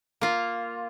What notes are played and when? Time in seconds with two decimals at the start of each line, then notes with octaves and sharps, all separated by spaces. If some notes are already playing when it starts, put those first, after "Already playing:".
0.21 A#3 F4